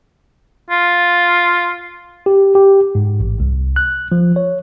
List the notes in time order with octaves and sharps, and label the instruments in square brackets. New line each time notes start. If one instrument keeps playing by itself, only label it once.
[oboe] F4
[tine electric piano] G4
G4
G#2
A1
C2
F#6
F3
C#5